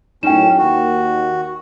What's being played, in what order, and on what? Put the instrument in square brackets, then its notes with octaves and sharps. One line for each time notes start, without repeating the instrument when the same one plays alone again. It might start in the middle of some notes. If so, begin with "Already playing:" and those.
[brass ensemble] B1 F#2 A2 [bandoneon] C#4 [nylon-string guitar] D#4 [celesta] G5 E7
[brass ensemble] D#2 [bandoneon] F#4